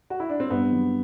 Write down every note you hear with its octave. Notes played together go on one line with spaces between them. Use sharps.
F#4
E4
D4
C4
G2 B3
F#3